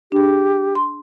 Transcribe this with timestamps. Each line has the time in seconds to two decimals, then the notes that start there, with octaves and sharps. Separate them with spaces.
0.12 D4 G4 G#4
0.75 C6